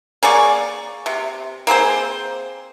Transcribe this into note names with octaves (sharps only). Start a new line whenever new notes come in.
A#3 G#4 D5 C#6
C3
A#3 C4 G#4 C5